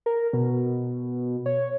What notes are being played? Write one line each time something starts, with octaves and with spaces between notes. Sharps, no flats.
A#4
B2
C#5